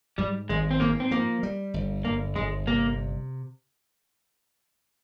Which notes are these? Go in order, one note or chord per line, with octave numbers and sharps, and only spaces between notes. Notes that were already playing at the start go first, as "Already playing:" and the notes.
G#2 G3
G#1 G#3
C4
G#2 A#3
C4
F3 A#3
G3
G1
G1 A#3
G1 G#3
C3 A#3